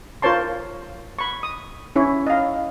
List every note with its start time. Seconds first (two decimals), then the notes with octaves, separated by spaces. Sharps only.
0.22 F4 A#4 C5 C#5 A5 C6
1.19 B5 C#6
1.43 D#6
1.96 C#4 E4 C#5
2.27 D#5 F5